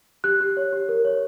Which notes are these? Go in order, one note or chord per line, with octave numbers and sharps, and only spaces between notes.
G4 F#6
G4
C#5
G4
A#4
C#5